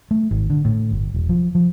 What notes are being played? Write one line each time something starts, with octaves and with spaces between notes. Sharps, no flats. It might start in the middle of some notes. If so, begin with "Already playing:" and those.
A3
G#1
D3
A2
G1
E1
F3
F3